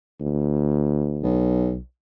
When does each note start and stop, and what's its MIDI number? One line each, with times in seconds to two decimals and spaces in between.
0.21 1.44 38
1.23 1.79 35